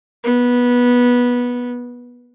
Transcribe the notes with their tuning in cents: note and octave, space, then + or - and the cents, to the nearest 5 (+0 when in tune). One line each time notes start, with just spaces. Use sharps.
B3 -15